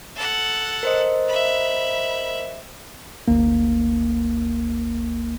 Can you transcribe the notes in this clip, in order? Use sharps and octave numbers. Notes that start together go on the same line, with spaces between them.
A4 F#5
A#4 C5 D#5
E5 B5
G1 D2 A#3